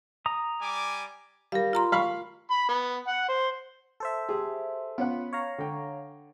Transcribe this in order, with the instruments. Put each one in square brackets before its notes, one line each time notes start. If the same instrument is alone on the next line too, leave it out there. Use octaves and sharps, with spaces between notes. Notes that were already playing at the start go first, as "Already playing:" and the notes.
[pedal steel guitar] A#5 D#6
[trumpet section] G3 G#5 D6
[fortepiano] G3 [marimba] A#4 F5
[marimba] F4 A#5 C6
[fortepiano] F5 B5 C#6
[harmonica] B5
B3
F#5
C5
[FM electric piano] A4 C5 E5
[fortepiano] G4 G#4
[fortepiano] B3 C#4 F#5 [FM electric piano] F4
[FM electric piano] C#5 F5 A#5
[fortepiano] D3 G5